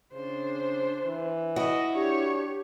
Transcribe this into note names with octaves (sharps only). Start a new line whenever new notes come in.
C#3 D4 C5
E3
E4 F#4 D#5
D4 G4 C#5